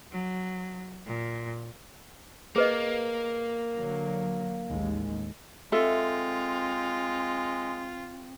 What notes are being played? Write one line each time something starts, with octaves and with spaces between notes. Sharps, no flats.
F#3
A#2
A#3 G#4 B4 D#5
D3 F#3
A1 D#2 G#3
G#3 C4 F4 A4 E5